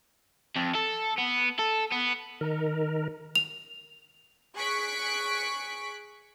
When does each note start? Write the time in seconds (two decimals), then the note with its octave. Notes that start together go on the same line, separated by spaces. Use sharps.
0.56 F2
0.75 A4
1.18 B3
1.59 A4
1.92 B3
2.41 D#3 A#4
3.35 F7
4.56 G#4 C#6 F#6 B6 D7